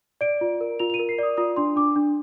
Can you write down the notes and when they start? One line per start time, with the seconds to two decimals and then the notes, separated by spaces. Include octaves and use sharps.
0.21 D5 D7
0.41 F4
0.61 A#4
0.79 F4 F7
0.90 F7
0.94 D#7
0.99 A#4
1.09 C7
1.18 D5 D#6
1.37 F4 D#6
1.56 D4 C6
1.76 D4 D6
1.96 D4